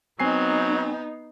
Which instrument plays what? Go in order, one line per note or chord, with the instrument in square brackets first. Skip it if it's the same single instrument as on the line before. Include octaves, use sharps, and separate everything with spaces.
[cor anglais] F#3 [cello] B3 D#4 [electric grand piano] C4 G#5 C7